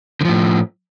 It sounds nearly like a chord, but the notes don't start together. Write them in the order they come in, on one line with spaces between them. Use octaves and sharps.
D3 F3 A2